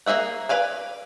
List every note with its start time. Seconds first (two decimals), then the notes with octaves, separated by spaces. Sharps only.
0.06 A#3 C#4 G#4 E5 F#5
0.49 B4 D5 F5 G#5